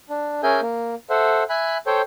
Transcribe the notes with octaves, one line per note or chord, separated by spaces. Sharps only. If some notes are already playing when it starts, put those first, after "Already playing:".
D4
C#4 G#4 A#4 E5 G#5 G6
A#3
A4 C5 E5 F#5
E5 G#5 B5 F#6
A4 C5 C#5 G5